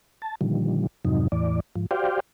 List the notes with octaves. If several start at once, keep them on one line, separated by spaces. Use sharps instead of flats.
A5
A#2 D3 D#3 F3 G3
F2 G#2 C3 F#3 D#4
E2 A2 E3 D5
G#2 F3
F#4 G4 C5 D5 F5 G5